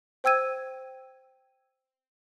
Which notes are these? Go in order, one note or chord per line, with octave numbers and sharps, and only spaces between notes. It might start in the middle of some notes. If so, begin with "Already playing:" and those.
C5 G5 E6 G#6 D#7